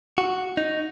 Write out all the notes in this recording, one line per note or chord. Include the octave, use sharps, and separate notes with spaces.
F#4
D#4